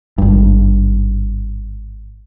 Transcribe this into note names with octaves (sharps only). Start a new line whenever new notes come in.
G#1 G2